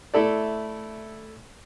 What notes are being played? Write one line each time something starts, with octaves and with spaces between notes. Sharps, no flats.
A3 E4 A4 D5